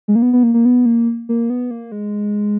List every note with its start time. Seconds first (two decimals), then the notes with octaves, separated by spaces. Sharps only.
0.08 G#3
0.15 A#3
0.22 B3
0.33 B3
0.43 A#3
0.54 A#3
0.65 B3
0.86 A#3
1.29 A#3
1.50 B3
1.71 A#3
1.92 G#3